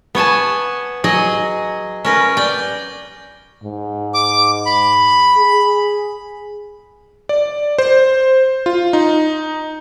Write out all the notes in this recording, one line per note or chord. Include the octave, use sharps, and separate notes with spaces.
B3 C#5 G#5 A5
F#3 G#4 D#5
C#4 A#4 B4
D5 G5
G#2
D6
B5
G#4
D5
C5
F4
D#4